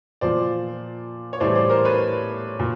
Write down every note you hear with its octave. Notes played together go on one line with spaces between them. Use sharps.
A#2 F3 C5 D5
C#5
A2 E3 G3 C5 D5
C5 D5
A#4 C5
B4 C#5
A#2